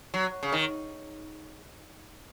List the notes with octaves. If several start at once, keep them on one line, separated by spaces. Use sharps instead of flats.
F#3
C#3
D#3